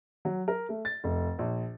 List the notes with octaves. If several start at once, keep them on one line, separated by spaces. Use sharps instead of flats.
F#3
A#4
A3
A6
F1
A#1